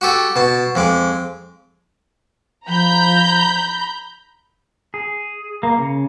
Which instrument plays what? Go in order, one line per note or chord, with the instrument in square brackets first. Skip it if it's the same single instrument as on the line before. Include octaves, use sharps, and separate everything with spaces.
[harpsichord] F#4 G4 A4
B2 A5
F2 G#3 D6
[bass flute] F3 [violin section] A#5 B5 G6
[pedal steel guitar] G#4
A#3
C#3